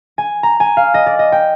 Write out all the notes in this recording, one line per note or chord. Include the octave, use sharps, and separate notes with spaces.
G#5
A#5
G#5
F5
D#5
D5
D#5
G5